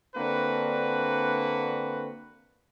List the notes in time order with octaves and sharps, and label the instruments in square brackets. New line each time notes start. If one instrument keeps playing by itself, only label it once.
[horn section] D3 A#3 C4 D4 F#4 B4